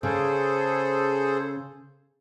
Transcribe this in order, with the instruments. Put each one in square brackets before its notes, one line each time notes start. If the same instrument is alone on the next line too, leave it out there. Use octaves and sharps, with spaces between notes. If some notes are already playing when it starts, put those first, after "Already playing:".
[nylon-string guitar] C#3 [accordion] G#4 A4 C5